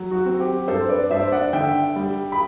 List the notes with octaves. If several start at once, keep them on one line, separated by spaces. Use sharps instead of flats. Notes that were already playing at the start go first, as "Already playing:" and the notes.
Already playing: F#3
F#4
C4
G4
G2 A4 C5
B4 D5
D5
G2 C5 E5
D5 F#5
D3 E5 G5
G3
B5